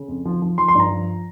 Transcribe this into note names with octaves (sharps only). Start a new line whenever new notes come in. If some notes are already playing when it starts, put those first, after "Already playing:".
Already playing: C#3
F2
F3
F3
F3 C6
C6
G2 A#5
F3